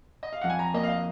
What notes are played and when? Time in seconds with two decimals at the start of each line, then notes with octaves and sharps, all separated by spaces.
0.23 D#5
0.33 F5
0.41 F2 F#5
0.50 G#5
0.59 A#5
0.74 A#3 D#5
0.83 F5
0.89 D#5